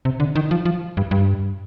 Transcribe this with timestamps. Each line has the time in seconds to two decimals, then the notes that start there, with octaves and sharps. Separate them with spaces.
0.05 C3
0.20 D3
0.35 D#3
0.51 F3
0.65 F3
0.97 G2
1.11 G2